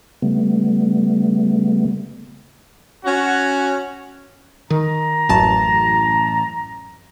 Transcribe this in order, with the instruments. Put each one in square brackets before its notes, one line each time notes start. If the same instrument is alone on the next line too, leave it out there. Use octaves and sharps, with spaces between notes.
[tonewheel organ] C#3 G3 A3 B3
[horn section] C#4 F#4
[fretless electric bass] D#3 [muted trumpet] A#5
[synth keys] A1 A5 [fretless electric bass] F#2